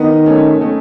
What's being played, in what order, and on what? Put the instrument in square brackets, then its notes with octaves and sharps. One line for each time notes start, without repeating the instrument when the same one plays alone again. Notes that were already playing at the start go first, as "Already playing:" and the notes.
Already playing: [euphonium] D#3 [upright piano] B3 D#4
[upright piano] A3 C#4
A3 C#4